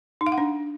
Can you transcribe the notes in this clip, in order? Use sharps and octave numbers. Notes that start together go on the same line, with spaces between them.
D#4
F5
F#5
D4